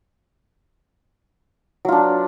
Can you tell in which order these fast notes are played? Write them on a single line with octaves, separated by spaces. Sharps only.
F#3 F4 D4